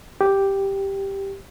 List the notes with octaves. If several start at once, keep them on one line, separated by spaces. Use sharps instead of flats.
G4